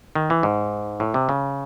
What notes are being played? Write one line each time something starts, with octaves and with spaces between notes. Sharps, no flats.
D#3
E3
G#2
A2
C3
C#3